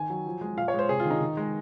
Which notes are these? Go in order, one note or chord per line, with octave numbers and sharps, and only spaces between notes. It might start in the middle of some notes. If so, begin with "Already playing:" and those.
Already playing: D#3 G#5
F#3
F3
G#3
A#2 F5
C#5
G#3 C5
C3 G#4
F4
D#3
D#4
D#3
G#3